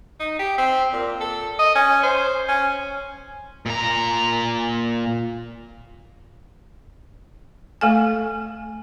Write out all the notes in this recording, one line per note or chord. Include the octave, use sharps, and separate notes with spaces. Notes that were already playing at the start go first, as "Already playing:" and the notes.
D#4
G4
C4
A#2
A4
D#5
C#4
C5
C#4
A#2 A#5
A3 A4 G#5